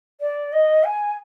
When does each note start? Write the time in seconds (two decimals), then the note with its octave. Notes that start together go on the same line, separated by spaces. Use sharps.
0.21 D5
0.53 D#5
0.84 G#5